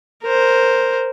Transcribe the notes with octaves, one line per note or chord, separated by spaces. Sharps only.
A#4 C5